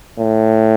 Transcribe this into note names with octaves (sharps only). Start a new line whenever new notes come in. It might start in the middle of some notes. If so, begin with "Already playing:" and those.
A2